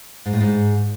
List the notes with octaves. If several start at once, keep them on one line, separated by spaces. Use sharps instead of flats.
G#2
A2
G#2